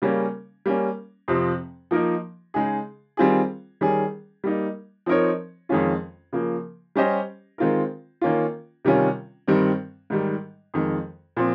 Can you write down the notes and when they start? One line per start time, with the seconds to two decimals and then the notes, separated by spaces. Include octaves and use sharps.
0.02 C#3 G3 A#3 C#4
0.66 G3 A#3 C#4
1.28 F2 C3 F3 C4
1.91 F3 A#3 D#4 A#4
2.54 C#3 G#3 D#4 G#4
3.17 D#3 G3 C4 F4 G#4
3.81 D#3 G3 C#4 G#4
4.44 G3 A#3 D#4
5.06 F3 C4 D#4 A#4 C#5
5.69 F2 D#3 G#3 C#4 F4
6.33 C#3 F3 A#3
6.96 G3 C#4 G4 C5 D#5
7.58 D#3 G#3 C4 F4 A#4
8.21 D#3 A#3 C#4 F4
8.85 C3 D#3 G3 C#4 F4
9.48 G2 D#3 G3 C4
10.10 G#2 D#3 G3
10.74 F2 D#3 G#3
11.37 A#2 F3 C4